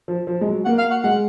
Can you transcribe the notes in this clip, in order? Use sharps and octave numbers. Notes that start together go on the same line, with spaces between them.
F3
F3
G#3
F#3
A#3 F#5
F5
F#5
G#3 F#5